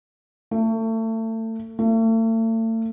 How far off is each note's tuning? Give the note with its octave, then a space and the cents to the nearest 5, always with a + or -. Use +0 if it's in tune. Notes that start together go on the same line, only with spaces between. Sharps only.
A3 +30
A3 +40